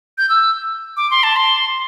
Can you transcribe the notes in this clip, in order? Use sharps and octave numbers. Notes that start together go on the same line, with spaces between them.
G6
E6
D6
C6
A5
C6